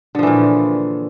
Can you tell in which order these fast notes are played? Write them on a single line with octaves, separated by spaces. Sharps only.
D3 F3 E3 A#2